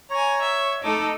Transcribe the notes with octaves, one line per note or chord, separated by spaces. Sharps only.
C#5 G#5 A#5
E5
A3 D#4 A4 D6